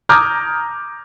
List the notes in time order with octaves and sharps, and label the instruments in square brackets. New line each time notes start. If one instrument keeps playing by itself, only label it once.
[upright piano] A#5 D6 D#6 F6 G6 G#6